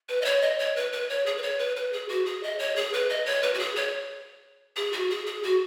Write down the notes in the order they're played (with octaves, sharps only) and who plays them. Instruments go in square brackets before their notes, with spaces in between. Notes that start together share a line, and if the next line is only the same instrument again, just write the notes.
[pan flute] B4
D#5
C#5
D#5
C#5
B4
B4
C#5
G#4
B4
C#5
B4
B4
G#4
F#4
G#4
D#5
C#5
G#4
B4
D#5
C#5
B4
F#4
G#4
C#5
G#4
F#4
G#4
G#4
F#4